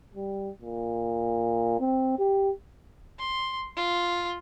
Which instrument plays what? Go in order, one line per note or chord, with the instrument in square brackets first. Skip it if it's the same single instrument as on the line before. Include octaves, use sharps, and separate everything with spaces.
[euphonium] G3
A#2
C4
G4
[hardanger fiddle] C6
F4